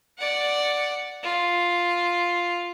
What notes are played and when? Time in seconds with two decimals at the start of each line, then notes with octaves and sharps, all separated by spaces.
0.18 D5 F#5
1.23 F4